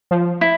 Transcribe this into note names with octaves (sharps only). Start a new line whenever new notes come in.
F3
E4